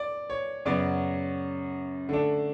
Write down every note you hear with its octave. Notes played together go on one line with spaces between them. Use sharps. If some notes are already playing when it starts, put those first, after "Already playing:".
Already playing: D5
C#5
F#2 C#3 F#3 B3 D5
D3 A3 D4